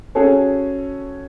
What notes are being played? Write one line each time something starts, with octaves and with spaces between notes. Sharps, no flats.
C#4 F#4 G#4 A4 C#5